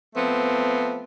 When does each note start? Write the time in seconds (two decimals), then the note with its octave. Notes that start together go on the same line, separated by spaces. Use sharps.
0.16 F3 A3 B3 C4